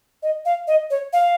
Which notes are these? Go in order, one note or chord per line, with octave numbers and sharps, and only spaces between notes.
D#5
F5
D#5
C#5
F5